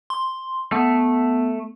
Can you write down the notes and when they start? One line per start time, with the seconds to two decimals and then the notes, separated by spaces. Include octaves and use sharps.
0.10 C6
0.72 A3 B3